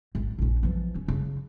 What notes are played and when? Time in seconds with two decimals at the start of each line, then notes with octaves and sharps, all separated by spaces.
0.15 G#1
0.38 A#1 C#4
0.63 E3 F3
0.95 C#4
1.08 C#3